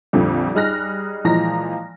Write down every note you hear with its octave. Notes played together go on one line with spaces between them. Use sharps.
A#1 F2 D3 G3
G3 D#4 G#4 F6 F#6 A#6
A#2 E3 F3 G#3 A#5 A#6